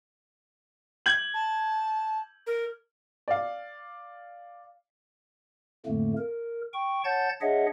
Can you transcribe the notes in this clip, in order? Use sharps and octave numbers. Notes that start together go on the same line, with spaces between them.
G#6 F#7
A5
A#4
D5 F5
F2 A2 D3 A3 A#3
A#4
G5 C#6
C#5 F#5 A5 G6 A6
D4 G#4 C#5 D#5 E5 F#5